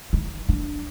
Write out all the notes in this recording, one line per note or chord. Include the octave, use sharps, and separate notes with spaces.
D#4
D4